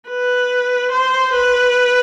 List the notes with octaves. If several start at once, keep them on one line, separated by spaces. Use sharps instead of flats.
B4
C5
B4